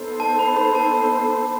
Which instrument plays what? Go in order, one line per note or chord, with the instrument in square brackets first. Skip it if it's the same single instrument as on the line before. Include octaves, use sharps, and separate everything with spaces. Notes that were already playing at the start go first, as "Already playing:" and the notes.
Already playing: [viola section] B3 D#4 A4 C5
[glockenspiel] A5
B5
B5
A5